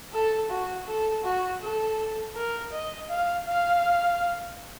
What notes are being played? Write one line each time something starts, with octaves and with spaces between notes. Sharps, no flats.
A4
F#4
A4
F#4
A4
A#4
D#5
F5
F5